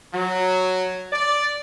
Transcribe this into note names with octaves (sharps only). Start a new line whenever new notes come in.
F#3
D5